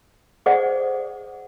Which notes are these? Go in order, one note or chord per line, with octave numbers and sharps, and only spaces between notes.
G#4 A4 C5 D5 D#5 F#5